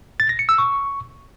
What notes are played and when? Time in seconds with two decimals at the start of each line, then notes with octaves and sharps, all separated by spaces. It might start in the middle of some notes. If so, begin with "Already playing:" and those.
0.20 A6
0.29 A#6
0.39 C#7
0.49 E6
0.58 C#6